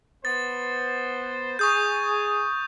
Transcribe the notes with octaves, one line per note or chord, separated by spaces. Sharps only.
B3 C5 A6
G#4 C#6 D#6 G6